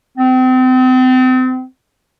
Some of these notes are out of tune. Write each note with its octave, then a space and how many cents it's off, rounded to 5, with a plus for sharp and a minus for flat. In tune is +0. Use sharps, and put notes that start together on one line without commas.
C4 -35